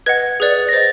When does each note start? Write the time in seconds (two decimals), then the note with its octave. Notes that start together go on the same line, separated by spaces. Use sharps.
0.06 B4 D#5 F#5 G#6
0.40 G#4 B4 D5
0.69 A#6
0.73 C5 D#5 A6